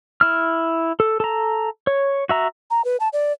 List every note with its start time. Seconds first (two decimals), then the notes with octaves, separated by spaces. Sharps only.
0.21 E4 F6
1.00 A4
1.20 A4 A#5
1.87 C#5
2.29 F#4 E5 A#5
2.71 A#5
2.85 B4
3.00 A5
3.13 D5